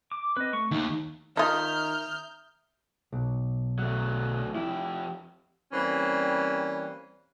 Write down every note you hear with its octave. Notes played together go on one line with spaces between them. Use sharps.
D6
C4 B4 D#5
A3 C#6
D#2 A3 D#4
D#3 D#4 F4 E5 A#5 D#6 F6 G6
B1
F#3 A3
F2 E4 G4
E3 G3 A#3 C4 C#4